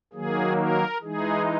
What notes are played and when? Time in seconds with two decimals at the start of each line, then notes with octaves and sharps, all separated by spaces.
0.13 D#3 F#3 A#3 G#4
0.58 A#4
1.02 E3 G#3 D#4 G#4